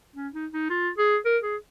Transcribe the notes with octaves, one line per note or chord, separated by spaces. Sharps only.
C#4
D#4
D#4
F4
G#4
A#4
G#4